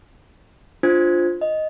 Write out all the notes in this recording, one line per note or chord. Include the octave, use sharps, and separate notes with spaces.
D4 F4 C5 G#6
D#5